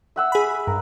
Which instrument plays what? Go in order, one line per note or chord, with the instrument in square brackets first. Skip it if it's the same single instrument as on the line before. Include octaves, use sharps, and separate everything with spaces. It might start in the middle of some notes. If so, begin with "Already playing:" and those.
[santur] E5 F#5 E6
[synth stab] G#4 B5
[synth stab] G2 [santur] A#4